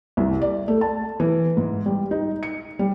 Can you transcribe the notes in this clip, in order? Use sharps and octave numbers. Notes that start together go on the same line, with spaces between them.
C2
D5
A3
A5
E3
G#2
G3
D#4
C#7
G3